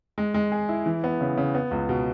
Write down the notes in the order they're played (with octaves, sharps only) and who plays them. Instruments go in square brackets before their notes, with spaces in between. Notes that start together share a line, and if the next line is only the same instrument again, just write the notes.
[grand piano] G#3
G#3
G#4
E4
E3
B3
C#3
C#3
B3
C#2
B2